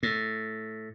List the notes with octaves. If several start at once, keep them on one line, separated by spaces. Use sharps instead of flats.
A2